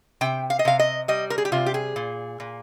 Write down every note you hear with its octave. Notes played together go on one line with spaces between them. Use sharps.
C3 G5
F5
D#5
C3 F5
D#5
G3 D#5
A#4
G#4
G4
C3 F4
G4
G#4
A#2
A#2